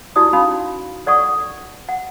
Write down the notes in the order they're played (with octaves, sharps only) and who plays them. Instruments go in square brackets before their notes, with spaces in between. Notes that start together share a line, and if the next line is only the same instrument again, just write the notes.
[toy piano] D#4 E4 F#4 D5 D#6
C#4 D#4 F#4 F5 B5
A4 D5 F#5 C#6 D#6
F#5